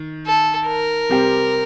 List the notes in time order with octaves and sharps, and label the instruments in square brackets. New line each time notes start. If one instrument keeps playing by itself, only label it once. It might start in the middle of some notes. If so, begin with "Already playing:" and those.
Already playing: [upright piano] D#3
[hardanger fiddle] A4
A#4
[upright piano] C3 G3 C4 G4